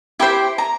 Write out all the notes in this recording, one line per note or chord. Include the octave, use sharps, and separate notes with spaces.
E4 G4 C5 B5
A#5